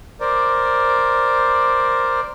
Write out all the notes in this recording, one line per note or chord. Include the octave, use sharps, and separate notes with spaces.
A#4 C5 D5